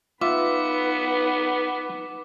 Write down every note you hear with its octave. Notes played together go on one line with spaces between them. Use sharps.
B3 D#4 F4 B4 E5 D6